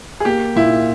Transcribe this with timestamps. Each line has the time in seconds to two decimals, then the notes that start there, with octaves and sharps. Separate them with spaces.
0.20 G#4
0.25 A#3 G4
0.56 A#2 E4